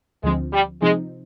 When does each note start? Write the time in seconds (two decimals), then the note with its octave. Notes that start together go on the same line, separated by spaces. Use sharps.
0.23 D2 D3 F3 G#3 C4
0.53 G3
0.82 C3 F3 G#3 C4 D#4